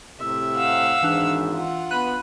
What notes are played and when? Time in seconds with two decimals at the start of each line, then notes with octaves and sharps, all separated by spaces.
0.19 A2 C3 E5
0.57 F5 F#5 E6
1.03 G#1 G#2 E3 D4
1.50 F4 F#5
1.91 B3 B5 F#6 D#7